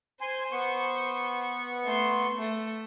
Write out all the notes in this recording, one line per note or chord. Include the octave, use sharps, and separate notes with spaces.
C5 G#5 C6
B3 C#6
A3 C6
A3